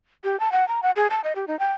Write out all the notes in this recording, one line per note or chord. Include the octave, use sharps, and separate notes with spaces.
G4
A5
F#5
A#5
F#5
G#4
A5
D#5
G4
D#4
G5